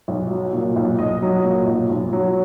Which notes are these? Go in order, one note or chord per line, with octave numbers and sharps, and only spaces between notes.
B1
F#3
A#2
B1
B1 D#5
F#3
A#2
B1
B1
F#3